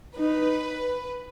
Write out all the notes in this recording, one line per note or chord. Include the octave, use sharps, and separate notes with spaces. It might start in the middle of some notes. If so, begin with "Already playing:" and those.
D#4 B4